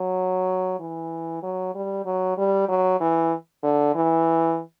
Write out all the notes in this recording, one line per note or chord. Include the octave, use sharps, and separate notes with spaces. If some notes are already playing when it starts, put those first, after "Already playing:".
Already playing: F#3
E3
F#3
G3
F#3
G3
F#3
E3
D3
E3